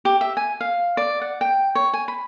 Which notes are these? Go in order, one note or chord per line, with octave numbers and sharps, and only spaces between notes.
G4
E5
G#5
F5
D5
F#5
G5
C#5
G#5
B5